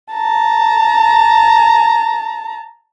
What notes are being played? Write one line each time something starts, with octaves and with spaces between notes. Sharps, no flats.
A5 A#5